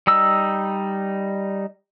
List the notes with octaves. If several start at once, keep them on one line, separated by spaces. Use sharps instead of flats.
G3 D#4 E6